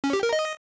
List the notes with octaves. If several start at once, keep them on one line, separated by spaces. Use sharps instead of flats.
C#4
G4
A#4
D#5